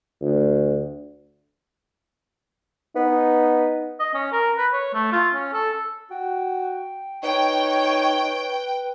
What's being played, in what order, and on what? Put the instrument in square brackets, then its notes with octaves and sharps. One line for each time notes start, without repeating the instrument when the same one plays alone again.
[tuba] D2
[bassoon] B3 [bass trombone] D#4
[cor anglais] D#5
C#4
A#4
B4
C#5
A3
F4
C#4
A4
[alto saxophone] F#4 [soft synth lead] G5
[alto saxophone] D#4 [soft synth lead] B4 [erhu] C#5 [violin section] G5